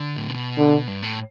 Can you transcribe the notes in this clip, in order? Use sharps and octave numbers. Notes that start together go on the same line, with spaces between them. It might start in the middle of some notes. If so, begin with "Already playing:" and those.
Already playing: D3
A2
B2
D3
G2
A2